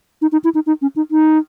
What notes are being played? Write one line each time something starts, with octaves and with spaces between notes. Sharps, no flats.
D#4
D#4
E4
D#4
D#4
C#4
D#4
D#4